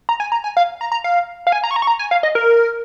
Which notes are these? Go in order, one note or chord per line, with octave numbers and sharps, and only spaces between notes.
A#5
G#5
A#5
G#5
F5
A#5
A#5
F5
F5
G#5
A#5
C#6
A#5
C#6
A#5
G#5
F5
D#5
A#4